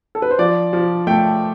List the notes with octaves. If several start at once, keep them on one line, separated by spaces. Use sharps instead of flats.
A4
B4
C5
F3 D5
F3
A3 G5